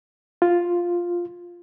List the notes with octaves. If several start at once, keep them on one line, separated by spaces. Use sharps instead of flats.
F4